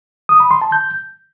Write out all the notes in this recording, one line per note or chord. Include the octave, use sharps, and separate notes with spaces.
D#6
B5
C6
A5
G6